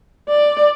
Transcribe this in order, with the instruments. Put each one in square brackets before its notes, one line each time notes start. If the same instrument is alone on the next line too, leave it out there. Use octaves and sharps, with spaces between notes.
[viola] D5